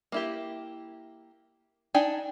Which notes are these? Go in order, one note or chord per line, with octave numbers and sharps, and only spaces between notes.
A#3 E4 G4
D4 D#4 G5 G#5